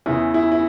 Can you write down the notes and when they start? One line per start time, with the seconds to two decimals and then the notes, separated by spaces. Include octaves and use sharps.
0.06 E2 C#3 E3 E4
0.34 E4
0.52 E4